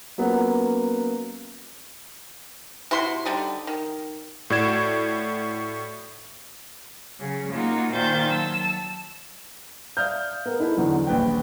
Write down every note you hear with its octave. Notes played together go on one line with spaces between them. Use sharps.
F#3 A#3 B3 C#4 F4 F#4
C3 E4 F#4 C6
D3 G3 D#4
D#3
A2 F#4 D5 G#6 E7
C#3 F#3
A#3 D#4 F4 F#4
A#2 D#3 C5 F5 G6 A6
F#3 A5 E6
D5 E5 F5 D#6 F6 G6
B3 A#4
D#4 E4 A4 B4
E2 D3 E3 F#3
D#1 A#1 B4 G5